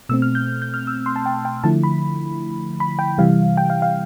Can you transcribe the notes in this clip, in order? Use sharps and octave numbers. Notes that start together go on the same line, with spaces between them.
B2 A3 C4 E6
F6
G6
G6
F6
E6
C6
A5
G5
G5
D3 F3 A3 E4 A5
B5
B5
G5
C3 E3 G3 F5
G5
F5
F5